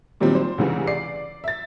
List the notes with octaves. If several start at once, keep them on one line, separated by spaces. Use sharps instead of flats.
A#2 D#3 F#3 G3 C4
C5
C2 C#3 E3
D5 C7
E5 A6